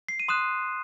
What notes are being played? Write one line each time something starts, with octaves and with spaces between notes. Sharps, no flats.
C7
D#7
C6 D#6 F#6 E7